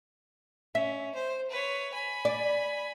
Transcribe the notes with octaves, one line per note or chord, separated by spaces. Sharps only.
C#4 E5
C5
B4 C#5
G#5 B5
D5